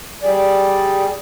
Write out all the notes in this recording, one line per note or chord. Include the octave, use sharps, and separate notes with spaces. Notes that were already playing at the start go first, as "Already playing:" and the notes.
G3 G#4 D5